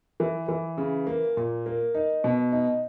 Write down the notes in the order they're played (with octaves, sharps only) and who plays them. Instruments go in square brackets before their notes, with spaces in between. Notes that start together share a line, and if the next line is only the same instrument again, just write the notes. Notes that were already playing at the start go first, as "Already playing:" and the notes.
[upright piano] E3
E3
C#3
A#3
A#2
A#3
D#4
B2
D#4